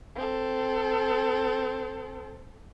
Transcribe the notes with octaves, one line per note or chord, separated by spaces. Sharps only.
C4 A4